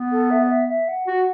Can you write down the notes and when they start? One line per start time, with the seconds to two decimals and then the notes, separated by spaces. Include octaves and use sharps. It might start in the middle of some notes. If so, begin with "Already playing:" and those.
Already playing: B3
0.11 A4
0.30 E5
0.43 C#5
0.49 E5
0.68 E5
0.88 F#5
1.07 F#4